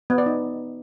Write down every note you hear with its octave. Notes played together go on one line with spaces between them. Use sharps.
B3
D5
D#4